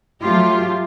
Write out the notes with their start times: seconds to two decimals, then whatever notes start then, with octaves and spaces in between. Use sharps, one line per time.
0.21 F#3 A3 F4 G4